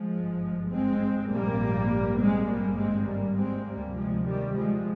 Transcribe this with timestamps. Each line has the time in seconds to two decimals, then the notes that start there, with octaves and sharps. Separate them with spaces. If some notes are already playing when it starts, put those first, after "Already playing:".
Already playing: F3 G#3
0.11 G#1 G2
0.71 G#3 C4
1.30 A#1 G#2 G3 A#3
2.19 G#3 C4
2.49 G#1 G2 G3 A#3
2.78 G#3 C4
3.08 G3 A#3
3.38 G#3 C4
3.67 D2 C3 G3 A#3
3.97 F3 G#3
4.27 D#3 G3
4.56 F3 G#3